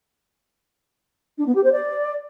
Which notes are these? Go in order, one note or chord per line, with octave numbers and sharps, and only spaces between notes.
D4
B3
G4
C5
D5